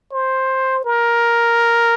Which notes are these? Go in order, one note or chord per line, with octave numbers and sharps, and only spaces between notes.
C5
A#4